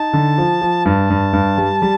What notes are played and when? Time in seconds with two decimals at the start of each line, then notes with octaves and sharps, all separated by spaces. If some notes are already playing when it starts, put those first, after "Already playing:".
Already playing: D#4 A5
0.13 D3
0.38 F3
0.62 F3
0.86 G2 A5
1.10 G2
1.33 G2
1.58 G3
1.82 G3